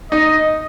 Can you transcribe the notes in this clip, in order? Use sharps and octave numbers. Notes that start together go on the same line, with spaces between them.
D#4 D#5